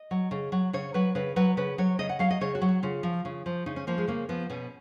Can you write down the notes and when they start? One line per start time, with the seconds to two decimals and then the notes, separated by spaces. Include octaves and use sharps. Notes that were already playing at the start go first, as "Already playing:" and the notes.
Already playing: D#5
0.11 F#3
0.31 C#3
0.52 F#3
0.73 C#3 C#5
0.94 F#3 B4
1.15 C#3 B4
1.36 F#3 B4
1.57 C#3 B4
1.78 F#3 C#5
1.99 C#3 D#5
2.09 F#5
2.19 F#3 F5
2.31 D#5
2.41 C#3 C#5
2.55 F#4
2.62 F#3
2.68 F#4
2.83 C#3 F4
3.03 F3
3.25 C#3
3.46 F3
3.66 C#3 D#4
3.76 C#4
3.87 F3 A#3
3.98 G#3
4.08 C#3 A#3
4.29 F3 B3
4.50 B2 C#4